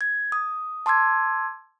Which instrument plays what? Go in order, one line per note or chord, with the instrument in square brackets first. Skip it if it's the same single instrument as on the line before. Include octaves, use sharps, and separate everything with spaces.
[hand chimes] G#6
D#6
A5 C6 D6 E6 G#6